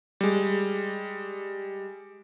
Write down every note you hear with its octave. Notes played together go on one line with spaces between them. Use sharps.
G3 G#3